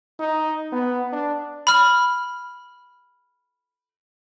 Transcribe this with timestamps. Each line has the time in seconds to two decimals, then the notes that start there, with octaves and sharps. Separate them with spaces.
0.20 D#4
0.73 B3
1.13 D4
1.67 B5 F6